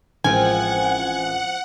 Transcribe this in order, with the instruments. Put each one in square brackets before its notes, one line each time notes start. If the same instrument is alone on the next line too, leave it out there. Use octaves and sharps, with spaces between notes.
[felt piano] A1 G#3 A#4 [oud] F3 C4 [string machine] F#5 [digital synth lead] G#5